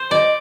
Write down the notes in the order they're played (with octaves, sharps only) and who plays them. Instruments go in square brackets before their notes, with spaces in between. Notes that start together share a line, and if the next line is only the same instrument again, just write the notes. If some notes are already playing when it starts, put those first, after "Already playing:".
Already playing: [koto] C5
[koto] D5 [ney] D#5